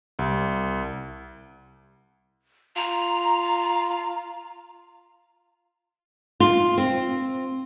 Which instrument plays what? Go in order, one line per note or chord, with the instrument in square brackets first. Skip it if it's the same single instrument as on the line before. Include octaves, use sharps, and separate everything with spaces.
[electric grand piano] C2
[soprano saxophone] F4 [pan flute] A#5
[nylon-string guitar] F4
C4